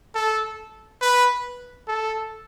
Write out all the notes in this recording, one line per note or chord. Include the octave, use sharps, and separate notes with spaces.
A4
B4
A4